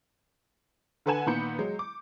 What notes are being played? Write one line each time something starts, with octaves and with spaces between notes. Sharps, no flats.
D3 A4 B4 F#5 G#5 E7
A#2 D#3 B3 B5 G6 C#7
F#3 G#3
D6